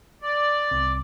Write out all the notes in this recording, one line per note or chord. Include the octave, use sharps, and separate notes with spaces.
D5
C2